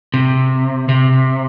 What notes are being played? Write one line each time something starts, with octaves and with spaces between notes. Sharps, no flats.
C3
C3